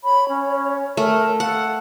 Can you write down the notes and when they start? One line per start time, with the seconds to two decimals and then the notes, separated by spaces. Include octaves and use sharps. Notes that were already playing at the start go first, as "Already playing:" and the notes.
0.04 C#5 B5
0.29 C#4
0.97 A3 A#4
1.40 A4 F5 F#5